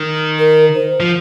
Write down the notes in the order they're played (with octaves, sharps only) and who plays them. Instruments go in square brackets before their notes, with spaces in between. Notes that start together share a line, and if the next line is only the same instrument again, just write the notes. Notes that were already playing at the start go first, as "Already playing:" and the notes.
Already playing: [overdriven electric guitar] D#3
[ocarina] A#4
C5
[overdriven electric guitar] F3